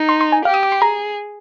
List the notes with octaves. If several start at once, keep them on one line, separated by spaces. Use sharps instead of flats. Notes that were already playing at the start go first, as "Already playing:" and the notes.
Already playing: D#4
C6
C6
G#5
G4 F5
D#6
D6
C6
G#4 A#5